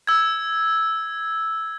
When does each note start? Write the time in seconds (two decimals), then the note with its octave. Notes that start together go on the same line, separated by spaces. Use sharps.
0.07 E6 G#6